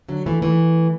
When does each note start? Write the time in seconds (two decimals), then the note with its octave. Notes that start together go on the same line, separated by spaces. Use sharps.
0.08 D3 F#3
0.26 E3 A3
0.42 E3 A3